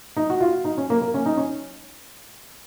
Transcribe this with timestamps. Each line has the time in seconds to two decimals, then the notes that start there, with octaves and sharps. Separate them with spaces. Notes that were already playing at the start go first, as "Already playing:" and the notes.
0.17 D#4
0.30 F#4
0.41 F4
0.65 D#4
0.78 C#4
0.90 A#3
1.02 A#3
1.14 C#4
1.26 D#4
1.37 C#4